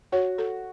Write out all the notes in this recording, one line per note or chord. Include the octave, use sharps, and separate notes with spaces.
F#4 C#5
A4